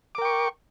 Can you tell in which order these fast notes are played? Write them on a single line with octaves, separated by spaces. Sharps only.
D6 A#4 G5 C#6